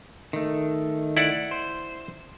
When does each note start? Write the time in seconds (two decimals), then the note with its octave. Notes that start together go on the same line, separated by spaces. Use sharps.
0.33 D#3 A3
1.17 E4 D5 F#5
1.51 C5